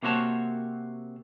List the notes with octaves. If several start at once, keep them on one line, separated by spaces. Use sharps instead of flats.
C3 A#3 C4 F#4 C#5 A5